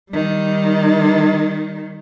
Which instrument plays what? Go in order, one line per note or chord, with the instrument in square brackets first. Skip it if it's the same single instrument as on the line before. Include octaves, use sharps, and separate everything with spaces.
[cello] D#3 G3